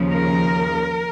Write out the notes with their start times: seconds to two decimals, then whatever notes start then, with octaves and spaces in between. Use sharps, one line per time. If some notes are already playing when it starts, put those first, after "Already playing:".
Already playing: D#2 C#3 F3
0.12 A#4